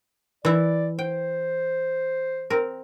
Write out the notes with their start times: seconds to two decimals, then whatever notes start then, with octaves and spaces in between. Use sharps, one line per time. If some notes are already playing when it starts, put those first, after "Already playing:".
0.45 E3 E4 D5
0.99 C5 G5
2.50 C4 A#4